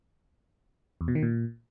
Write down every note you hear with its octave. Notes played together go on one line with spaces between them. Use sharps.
E2
B2
D#3
A#2